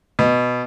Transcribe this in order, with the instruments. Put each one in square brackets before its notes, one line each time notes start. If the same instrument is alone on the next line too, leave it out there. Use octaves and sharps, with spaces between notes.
[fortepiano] B2